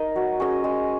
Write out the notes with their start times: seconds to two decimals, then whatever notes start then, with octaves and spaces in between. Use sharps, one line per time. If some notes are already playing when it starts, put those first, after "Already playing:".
Already playing: D#4 A#4 D#5
0.16 F#3
0.40 C#4 G#4 D#5
0.64 G#3